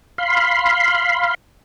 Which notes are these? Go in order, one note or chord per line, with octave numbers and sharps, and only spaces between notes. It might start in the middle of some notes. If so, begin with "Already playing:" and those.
F5 B5 C6